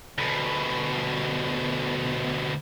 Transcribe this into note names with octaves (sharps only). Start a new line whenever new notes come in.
D2 B2